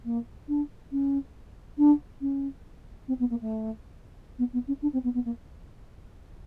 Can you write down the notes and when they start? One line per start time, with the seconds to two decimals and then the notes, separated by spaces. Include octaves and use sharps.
0.04 A#3
0.48 D4
0.91 C#4
1.77 D4
2.21 C#4
3.07 C4
3.19 B3
3.30 A#3
3.40 A3
4.38 B3
4.52 B3
4.67 C#4
4.82 D4
4.92 C4
5.03 B3
5.14 B3
5.24 A#3